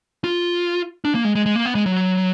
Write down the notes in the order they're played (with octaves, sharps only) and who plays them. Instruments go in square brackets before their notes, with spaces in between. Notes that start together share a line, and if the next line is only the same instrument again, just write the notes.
[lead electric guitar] F4
D4
A#3
G#3
G#3
G#3
A#3
B3
G#3
F#3